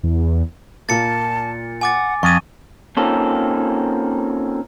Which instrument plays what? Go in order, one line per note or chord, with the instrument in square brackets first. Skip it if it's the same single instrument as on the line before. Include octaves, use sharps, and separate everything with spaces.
[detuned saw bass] E2
[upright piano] A#2 A#3 [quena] A5 [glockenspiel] A6 C#7
[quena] F#5 [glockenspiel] G#5 D6 A6
[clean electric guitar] F2 [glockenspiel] C#6 D#7 [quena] D#6
[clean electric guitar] A#3 C4 C#4 D#4 F4 A4